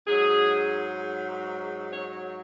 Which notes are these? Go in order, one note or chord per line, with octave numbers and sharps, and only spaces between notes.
G#2 F#3 G#4
C#5